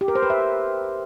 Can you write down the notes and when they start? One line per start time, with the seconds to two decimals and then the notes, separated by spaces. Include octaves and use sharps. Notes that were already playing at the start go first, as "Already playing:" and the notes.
0.01 G4
0.08 A#4
0.15 C5
0.23 B4
0.30 E5